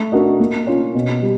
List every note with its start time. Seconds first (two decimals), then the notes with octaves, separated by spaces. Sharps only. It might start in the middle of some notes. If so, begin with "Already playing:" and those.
Already playing: A3
0.12 D4 F#4 A#4 D#5
0.40 A#3
0.67 C#4 F4
0.95 B2
1.22 G3